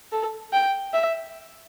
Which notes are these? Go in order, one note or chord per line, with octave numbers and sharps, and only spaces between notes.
A4
G5
E5